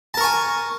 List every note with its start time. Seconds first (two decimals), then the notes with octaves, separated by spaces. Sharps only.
0.14 A5
0.17 A#4
0.21 C#6
0.24 G#5